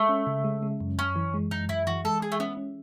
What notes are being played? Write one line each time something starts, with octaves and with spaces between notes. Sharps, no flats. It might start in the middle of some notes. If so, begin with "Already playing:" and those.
Already playing: G#3 A3
C#4
C#3
G#3
G#3
F#2
F#2 C#4
E3
G#3
F#2 D#4
F#2 E4
E3 F#4
G#3 A4
G#3 G#4
A3
B3 C#4
C#4